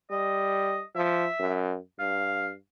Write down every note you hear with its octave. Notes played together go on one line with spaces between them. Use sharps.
G3 D#5
F3 E5
F#2
G2 F5